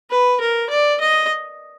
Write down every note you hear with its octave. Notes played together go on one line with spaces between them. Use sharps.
B4
A#4
D5
D#5